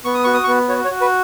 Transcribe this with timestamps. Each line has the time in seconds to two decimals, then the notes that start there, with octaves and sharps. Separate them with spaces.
0.05 B3 C#6
0.14 D#6
0.24 F#4 C#6
0.34 D#6
0.44 C#6
0.48 B3
0.69 F#4 C#5
0.85 C#5
0.91 F#4
1.01 B4